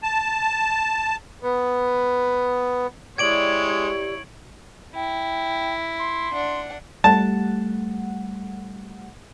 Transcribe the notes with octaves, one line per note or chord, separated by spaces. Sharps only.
A5
B3
G#3 E4 G4 C#5 D5 G#6 D7 F#7
E4 G5
C6
D4 F#5
G3 A3 F#5 A5